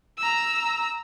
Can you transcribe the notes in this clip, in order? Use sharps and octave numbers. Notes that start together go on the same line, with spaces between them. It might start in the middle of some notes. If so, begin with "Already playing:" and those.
A#5 E6